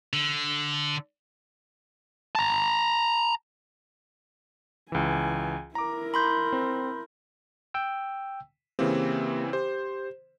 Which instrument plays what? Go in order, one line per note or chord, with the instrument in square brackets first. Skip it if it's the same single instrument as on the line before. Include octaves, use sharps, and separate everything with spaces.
[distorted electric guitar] D3
[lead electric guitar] A5 A#5
[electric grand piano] C#2 E3 [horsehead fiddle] G#5
[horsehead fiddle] E4 A#4 [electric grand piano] A#5 D6
[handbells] B5 C6 G6
[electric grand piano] C4
[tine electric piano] G5 E6
[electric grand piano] C#3 E3 C4 [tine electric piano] A#3 G4
[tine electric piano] G4 [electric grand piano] C5